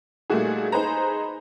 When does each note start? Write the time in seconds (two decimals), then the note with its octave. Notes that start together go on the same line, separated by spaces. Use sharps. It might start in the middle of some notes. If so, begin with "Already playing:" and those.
0.30 A#2 G3 A3 D#4 F#4 G#4
0.72 D#4 G#4 B4 C5 A#5